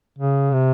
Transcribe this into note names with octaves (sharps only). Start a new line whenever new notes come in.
C#3
C3